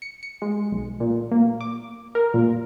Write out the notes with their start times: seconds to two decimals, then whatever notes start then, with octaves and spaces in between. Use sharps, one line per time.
0.02 C#7
0.23 C#7
0.42 G#3
0.72 B1
1.00 A#2
1.31 A#3
1.61 D6
2.15 A#4
2.34 A#2